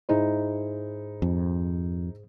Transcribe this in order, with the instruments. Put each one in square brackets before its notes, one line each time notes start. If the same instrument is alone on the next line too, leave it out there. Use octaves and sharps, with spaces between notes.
[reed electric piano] G#2 G#4 C5 [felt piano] D#4 E4
[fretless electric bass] F2